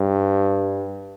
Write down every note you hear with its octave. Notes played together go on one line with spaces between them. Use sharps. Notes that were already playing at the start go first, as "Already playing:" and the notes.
Already playing: G2